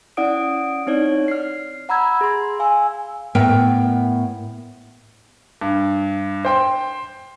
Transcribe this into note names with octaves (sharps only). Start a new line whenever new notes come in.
C#4 E4 D5 F#5 D#6 D7
C4 D#4 C#5 D5
F6 C7
F#5 A#5 B5 E6 G#6
G#4 C6
F5 G#5 E6
A2 B3 A#4 E5 G5
G2
C5 G5 C6